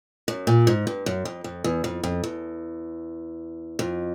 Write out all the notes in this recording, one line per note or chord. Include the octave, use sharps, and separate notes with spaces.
F#2
A#2
G#2
G2
F#2
F2
F2
E2
F2
F2
E2
F2